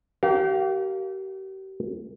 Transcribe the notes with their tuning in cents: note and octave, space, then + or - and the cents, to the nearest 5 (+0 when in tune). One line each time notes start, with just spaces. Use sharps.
G4 -40 A#4 -10 F5 +0